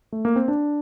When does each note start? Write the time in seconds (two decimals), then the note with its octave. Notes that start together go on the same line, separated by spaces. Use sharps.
0.12 A3
0.25 A#3
0.36 C4
0.48 D4